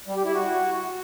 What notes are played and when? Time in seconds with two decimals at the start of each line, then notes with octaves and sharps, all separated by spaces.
0.07 G3
0.16 G4
0.25 E4
0.34 F#4